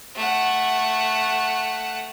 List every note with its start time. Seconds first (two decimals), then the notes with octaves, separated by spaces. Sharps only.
0.15 A3 F#5